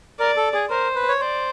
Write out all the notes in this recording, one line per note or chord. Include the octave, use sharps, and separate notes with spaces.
A#4 D5
A4
G#4
A#4 C5
B4
C#5
C5 D5